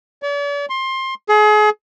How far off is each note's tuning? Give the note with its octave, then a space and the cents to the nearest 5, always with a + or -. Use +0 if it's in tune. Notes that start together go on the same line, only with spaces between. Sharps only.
D5 -45
C6 +20
G#4 +35